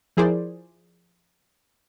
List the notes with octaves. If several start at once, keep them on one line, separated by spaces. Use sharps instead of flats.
F3 E4 G#4 A#4 C5 D5